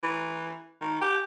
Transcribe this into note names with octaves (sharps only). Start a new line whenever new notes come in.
E3
D#3
G4